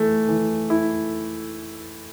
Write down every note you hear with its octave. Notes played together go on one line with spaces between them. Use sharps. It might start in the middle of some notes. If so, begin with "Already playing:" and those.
Already playing: E3 A3
E3
E4